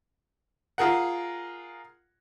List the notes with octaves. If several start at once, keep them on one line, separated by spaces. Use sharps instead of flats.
F4 G#4 A#4 F#5